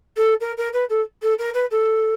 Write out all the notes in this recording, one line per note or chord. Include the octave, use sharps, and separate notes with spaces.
A4
A#4
A#4
B4
A4
A4
A#4
B4
A4